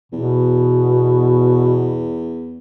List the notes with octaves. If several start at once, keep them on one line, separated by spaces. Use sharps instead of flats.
E2 B2